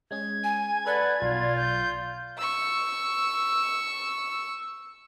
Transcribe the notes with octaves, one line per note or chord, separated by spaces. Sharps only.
G#3 C#4 G#4 G#6
G#5
A4 B4 D5 F#5 G6
B1 F4
G6
C#6 E6